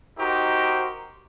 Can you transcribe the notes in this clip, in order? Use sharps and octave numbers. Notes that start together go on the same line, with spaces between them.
D#4 F#4 G4 A#4 C5